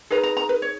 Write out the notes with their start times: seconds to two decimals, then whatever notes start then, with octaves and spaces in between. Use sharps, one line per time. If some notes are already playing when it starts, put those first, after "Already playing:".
0.10 D#4 G#4 B4 A#5
0.23 A#5
0.37 A#5
0.49 B4
0.62 C#5